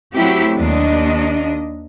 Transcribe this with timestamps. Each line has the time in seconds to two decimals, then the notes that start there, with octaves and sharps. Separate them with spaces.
0.15 F#3 A3 C4 E4 G4
0.58 D#2 D4 D#5